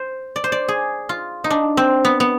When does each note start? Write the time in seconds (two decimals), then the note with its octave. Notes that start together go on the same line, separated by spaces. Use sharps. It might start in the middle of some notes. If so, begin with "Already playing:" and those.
Already playing: C5
0.36 D5
0.44 C5
0.52 D5
0.68 G#4
1.09 F4
1.44 D#4
1.50 D4
1.77 C4
2.05 B3
2.20 B3